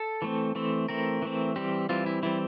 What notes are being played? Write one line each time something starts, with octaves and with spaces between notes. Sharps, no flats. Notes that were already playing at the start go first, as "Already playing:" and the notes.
Already playing: A4
E3 A3 C4
E3 A3 C4
E3 A3 C4 A#4
E3 A3 C4
E3 G3 C4 G4
E3 G3 C4 F4
E4
E3 G3 C4 E4